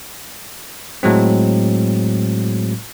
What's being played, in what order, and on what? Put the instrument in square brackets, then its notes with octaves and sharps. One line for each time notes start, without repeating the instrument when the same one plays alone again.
[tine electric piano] A2 F#3 G#3 C4